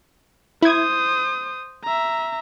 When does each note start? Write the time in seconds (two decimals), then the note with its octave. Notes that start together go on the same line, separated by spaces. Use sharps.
0.62 E4 C5 D#6 G#6
1.84 E5 A#5